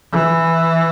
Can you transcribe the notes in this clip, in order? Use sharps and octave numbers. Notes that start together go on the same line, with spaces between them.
E3